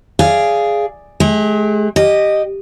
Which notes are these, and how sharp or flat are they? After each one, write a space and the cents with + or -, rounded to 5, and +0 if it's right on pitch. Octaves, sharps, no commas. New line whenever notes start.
G#4 +0 D5 +5 F5 -15
G#3 +45 G#4 -40
G4 +0 D#5 -10